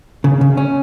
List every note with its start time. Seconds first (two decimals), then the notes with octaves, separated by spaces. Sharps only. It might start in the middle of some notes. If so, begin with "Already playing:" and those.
0.24 C#3
0.41 C#3
0.57 C#4